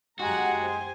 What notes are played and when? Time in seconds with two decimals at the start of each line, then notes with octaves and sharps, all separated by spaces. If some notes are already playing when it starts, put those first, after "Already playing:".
0.20 F#2 G#3 F#4 G4 F#5 G#5 A#5
0.61 C5